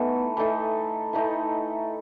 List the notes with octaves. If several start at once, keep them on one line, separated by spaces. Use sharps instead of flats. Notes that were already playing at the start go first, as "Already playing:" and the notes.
Already playing: E3 A3 B3 D#4 A4
E3 A3 D#4 A4
E3 A3 D#4 A4